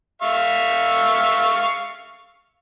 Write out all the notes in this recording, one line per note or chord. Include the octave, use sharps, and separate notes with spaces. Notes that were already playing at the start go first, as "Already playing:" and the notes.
E5 F5 C#6